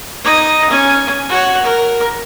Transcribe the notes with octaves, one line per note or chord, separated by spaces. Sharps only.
D#4 D#5
C#4 G#5
F#4 C#5
A#4